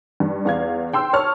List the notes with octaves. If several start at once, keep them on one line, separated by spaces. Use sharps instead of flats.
G2
E2 F5 G#6
G5 C6 E6
C#5 A5 C#6 F6